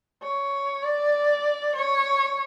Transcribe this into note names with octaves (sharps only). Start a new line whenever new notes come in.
C#5
D5
C#5